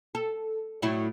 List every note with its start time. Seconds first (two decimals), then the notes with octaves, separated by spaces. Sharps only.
0.15 A4
0.82 A2 F#3 E4